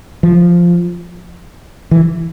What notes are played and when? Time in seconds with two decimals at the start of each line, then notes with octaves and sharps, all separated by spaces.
0.23 F3
1.91 E3